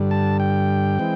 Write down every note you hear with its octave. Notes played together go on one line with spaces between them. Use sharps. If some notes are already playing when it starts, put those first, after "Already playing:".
Already playing: G2 D3 G3
A5
G5
E3 G#3 C4